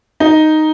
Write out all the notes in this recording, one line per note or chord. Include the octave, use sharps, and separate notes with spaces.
D#4